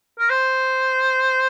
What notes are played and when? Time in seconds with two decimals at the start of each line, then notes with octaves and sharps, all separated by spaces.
0.19 A#4
0.30 C5